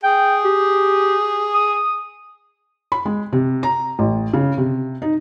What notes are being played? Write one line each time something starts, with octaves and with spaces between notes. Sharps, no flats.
G#4 G5
G4
D#6
B5
G#3
C3
A#5
A1
C#3
C3
D#4